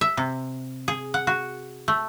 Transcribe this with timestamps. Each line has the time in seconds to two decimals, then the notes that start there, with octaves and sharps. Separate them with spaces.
0.01 E5
0.17 C3
0.88 G#4
1.14 F#5
1.27 F#4
1.88 A3